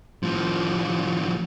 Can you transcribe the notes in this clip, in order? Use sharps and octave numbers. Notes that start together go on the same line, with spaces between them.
A2 F3